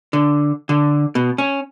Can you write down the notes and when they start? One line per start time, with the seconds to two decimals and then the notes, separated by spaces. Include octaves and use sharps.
0.13 D3
0.69 D3
1.15 B2
1.38 C#4